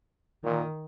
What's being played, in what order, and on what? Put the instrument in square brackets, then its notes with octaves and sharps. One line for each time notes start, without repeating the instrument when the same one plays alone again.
[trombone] A#2 [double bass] D#3